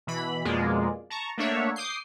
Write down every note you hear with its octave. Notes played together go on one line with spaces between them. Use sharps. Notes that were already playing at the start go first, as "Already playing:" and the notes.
B2 E3 B5
F2 B2 G#3 A#3 F4 D5
A5 A#5 C#6
A3 A#3 D4 C#5 E5 F#5
D6 D#6 G6 C7